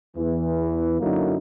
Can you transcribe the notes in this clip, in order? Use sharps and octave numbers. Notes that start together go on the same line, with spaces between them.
E2 E3
F#2 D3 F#3 A#3 D#4 E4